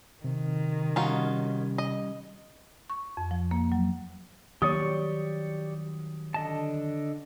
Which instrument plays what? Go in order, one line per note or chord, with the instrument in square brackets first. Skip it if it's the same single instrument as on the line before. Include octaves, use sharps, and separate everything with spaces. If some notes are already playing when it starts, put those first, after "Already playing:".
[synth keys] C3 [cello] D#3
[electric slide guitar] G3 C#4 [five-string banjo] D#4 F4 F#4
[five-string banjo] D#5
[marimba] C#6
F2
F3
A#3
F#3
[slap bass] D#3 F#3 G3 [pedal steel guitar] G4 D5 C#6 [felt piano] C#5 D#6
[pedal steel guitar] D3 D#5 A5